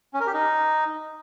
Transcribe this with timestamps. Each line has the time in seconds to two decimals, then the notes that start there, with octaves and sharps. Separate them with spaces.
0.14 C#4
0.20 A#4
0.27 G4
0.33 D#4